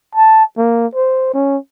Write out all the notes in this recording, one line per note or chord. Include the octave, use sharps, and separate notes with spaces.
A5
A#3
C5
C#4